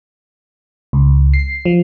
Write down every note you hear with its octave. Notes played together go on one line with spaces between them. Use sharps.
C#2
C7
F3